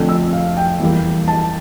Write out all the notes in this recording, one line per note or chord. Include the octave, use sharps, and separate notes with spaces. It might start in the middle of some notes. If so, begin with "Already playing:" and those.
Already playing: F2 D3 A3
E6
F5
G5
E2 E3 G3 A#3
A5